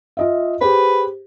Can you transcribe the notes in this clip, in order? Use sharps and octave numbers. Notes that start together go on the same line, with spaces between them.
F4 D#5 E5
G4 G#4 B4 C5